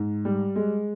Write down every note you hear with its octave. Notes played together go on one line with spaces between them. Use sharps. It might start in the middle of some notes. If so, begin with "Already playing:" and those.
Already playing: G#2
G3
G#3